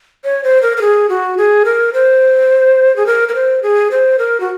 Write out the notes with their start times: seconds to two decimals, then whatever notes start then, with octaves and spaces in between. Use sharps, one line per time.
0.24 C#5
0.44 C5
0.62 A#4
0.77 A#4
0.81 G#4
1.09 F#4
1.38 G#4
1.65 A#4
1.93 C5
2.96 G#4
3.06 A#4
3.29 A#4
3.35 C5
3.63 G#4
3.91 C5
4.19 A#4
4.40 F#4